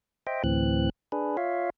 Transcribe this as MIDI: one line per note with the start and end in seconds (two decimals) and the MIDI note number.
0.27 0.43 72
0.27 0.43 75
0.27 0.43 76
0.27 0.43 79
0.44 0.90 38
0.44 0.90 45
0.44 0.90 52
0.44 0.90 60
0.44 0.90 90
1.12 1.37 62
1.12 1.37 68
1.12 1.37 71
1.37 1.70 65
1.37 1.70 73
1.37 1.70 76
1.37 1.70 77